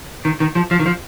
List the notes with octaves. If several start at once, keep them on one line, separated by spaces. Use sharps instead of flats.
D#3
D#3
F3
F3
D#3
F3